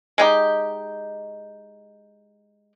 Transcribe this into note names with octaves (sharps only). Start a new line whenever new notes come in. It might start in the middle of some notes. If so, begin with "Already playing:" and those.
G#3 D#4 G4